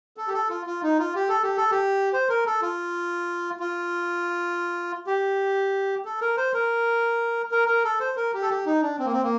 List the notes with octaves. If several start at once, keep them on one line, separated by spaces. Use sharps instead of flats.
A4
G4
A4
F4
F4
D#4
F4
G4
A4
G4
A4
G4
C5
A#4
A4
F4
F4
G4
A4
A#4
C5
A#4
A#4
A#4
A4
C5
A#4
G4
A4
G4
D#4
D4
C4
A#3
C4
A#3